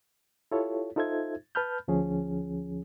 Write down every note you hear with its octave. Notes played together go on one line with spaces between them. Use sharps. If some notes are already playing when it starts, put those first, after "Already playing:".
E4 F4 G4 A4 C#5
D#4 F4 A4 C5 E5 G#6
B4 A5 B5 F6 G6
D2 F3 C#4 G#4